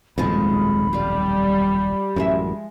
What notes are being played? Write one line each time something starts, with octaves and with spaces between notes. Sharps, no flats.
D#1 B1 F2 G#2 F3 G#3 B5
G3 F4 D5
A1 F#2 F3 G#3 E5